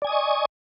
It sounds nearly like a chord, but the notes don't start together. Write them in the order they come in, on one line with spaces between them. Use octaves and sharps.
D5 G#5 D#6 D#5 C#6